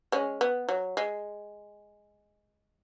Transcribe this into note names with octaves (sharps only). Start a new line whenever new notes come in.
G#3 C#4
B3
F#3
G#3